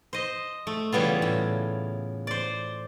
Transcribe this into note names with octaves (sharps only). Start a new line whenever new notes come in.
C5 D#5
A3
C#3 E3 G3 B3 F4
A2 C#3
C5 D5